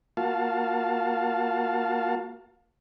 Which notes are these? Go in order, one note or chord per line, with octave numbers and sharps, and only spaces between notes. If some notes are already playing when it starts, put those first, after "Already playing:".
A#3 F4 F#4 F5 A5